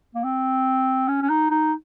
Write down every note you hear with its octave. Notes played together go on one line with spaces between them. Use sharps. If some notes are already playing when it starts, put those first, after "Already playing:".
A#3
C4
C#4
C#4
D#4
D#4